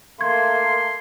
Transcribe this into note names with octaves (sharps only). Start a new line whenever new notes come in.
A3 A#3 C6 G#6